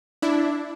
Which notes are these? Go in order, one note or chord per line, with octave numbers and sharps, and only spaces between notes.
D4 E4